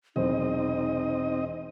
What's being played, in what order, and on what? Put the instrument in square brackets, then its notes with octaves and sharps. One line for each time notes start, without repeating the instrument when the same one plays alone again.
[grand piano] E1 E2 [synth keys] C3 F#3 C5 [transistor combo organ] C4 D#5 [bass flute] D#4